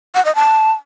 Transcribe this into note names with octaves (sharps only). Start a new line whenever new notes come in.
F#5
D#5
A5